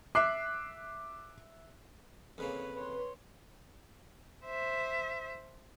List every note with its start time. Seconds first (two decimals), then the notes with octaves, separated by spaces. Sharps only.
0.15 E5 D6 F#6 C7
2.38 F2 C#3 A#3 B4 C#5
2.76 B4 C#5 C6
4.46 C5 E5